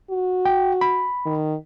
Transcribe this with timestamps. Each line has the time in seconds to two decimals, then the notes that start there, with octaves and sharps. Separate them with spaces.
0.10 F#4
0.45 G5
0.81 B5
1.26 D#3